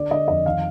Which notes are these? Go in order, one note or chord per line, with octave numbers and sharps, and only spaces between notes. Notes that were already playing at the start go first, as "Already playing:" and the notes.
Already playing: D3 D5
D3 D#5
F2 D#5
D#3 F5